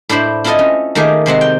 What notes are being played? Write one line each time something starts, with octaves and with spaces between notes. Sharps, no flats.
A2 D4 E4 C5 B5
C4 E4 F4 A4 D#5 G#5
C#4
D#3 A3 A#3 G4 G#4
C3 G#3 C4 F#5
G5